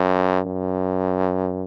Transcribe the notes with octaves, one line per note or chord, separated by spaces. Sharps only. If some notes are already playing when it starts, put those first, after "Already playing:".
Already playing: F#2
F#2